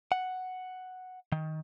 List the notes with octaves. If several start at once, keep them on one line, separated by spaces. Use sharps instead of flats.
F#5
D#3